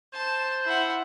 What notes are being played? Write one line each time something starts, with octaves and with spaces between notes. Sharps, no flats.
C5 A5
E4 F#5